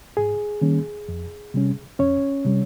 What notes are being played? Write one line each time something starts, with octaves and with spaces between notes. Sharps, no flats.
G#2 G#4
D#3 G3 A#3 C#4
F2
C3 G3 C#4
F2 C#4 C#5
C3 G3 C#4